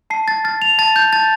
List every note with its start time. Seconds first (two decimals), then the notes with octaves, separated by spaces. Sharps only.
0.10 A5 C7
0.28 A6
0.44 F6 A6
0.62 F7
0.79 A5 A6
0.96 G6
1.13 A5 A6